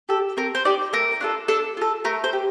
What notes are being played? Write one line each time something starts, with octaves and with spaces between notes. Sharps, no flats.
G4 A4
C4 A#4
C5
D#4 G4 D5
A3 A#4
D4 F4 A4
D4 A4
F4 A4
A3 A#4
C5
G4